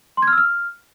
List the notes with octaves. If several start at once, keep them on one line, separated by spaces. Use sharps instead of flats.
C6
G#6
F6
E6
F6